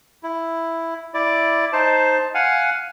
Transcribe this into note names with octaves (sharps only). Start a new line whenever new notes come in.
E4
E4 D5
D#4 C5 A5
F5 F#5 G#5